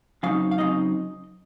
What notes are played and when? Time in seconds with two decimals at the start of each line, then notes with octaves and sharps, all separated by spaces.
0.23 C#3 F#3 C4 D#4 F5
0.51 F5
0.58 C#3 F#3 C4 D#4 D#5